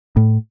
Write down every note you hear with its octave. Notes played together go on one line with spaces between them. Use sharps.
A2